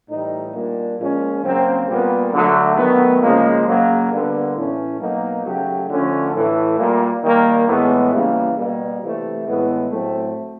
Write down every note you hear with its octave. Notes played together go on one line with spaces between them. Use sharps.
A2 E3 G3 D#4
A#2 G3 A#3 D4
A#2 F3 G#3 C#4
C#3 F#3 A#3 C4
A#2 G3 A#3 B3
D3 F#3 A3
D#3 F#3 A3 B3
C#3 F3 G#3 A#3
C#3 F#3 A#3
D3 G3 A#3 B3
A2 E3 A3 C#4
B2 F#3 A#3 D#4
C#3 F#3 A3 G4
D3 F3 A3 C#4
A2 E3 A3
A#2 G3 A#3
D#3 G3 A#3
A2 E3 G#3 B3
C#3 E3 G3 A#3
B2 G3 A#3
C3 E3 A3
A2 E3 G#3 B3
A2 F#3 A3 C4